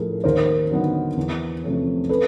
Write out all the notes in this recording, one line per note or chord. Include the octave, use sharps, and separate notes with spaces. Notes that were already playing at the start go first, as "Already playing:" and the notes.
Already playing: A2 F3 A3 G#4 A#4
D#2 A#4 C5
D3 F#3 B3 D#4
E2
C3 F3 A3 C#4
A4 B4